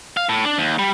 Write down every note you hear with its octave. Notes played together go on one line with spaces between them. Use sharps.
F5
A2
D4
D#2
G3